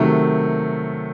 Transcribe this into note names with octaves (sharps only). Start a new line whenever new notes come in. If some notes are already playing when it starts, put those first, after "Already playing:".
Already playing: C3 D#3 F#3 A3